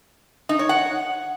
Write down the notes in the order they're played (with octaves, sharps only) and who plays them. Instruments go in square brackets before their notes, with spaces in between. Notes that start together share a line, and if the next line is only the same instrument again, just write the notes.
[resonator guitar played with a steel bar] D#4
C#5
F#5